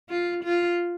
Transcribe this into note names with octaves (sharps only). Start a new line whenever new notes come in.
F4
F4